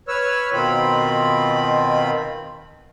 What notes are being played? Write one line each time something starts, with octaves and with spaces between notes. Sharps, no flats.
B4 C#5 E6 F6
B2 D#3 C4 F4 B5